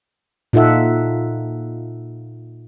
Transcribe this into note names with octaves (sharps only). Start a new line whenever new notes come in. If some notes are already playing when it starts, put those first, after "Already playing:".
A#2 D#4 F4 A4 E5 F#5